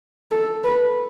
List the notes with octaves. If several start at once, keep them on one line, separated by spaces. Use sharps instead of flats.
A4
B4